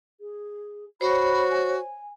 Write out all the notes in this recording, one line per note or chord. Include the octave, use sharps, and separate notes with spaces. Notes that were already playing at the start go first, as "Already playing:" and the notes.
G#4
F#4 C5 C#5 B5
G#5